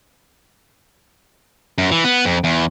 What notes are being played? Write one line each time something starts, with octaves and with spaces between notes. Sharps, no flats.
F#2
E3
B3
F2
E2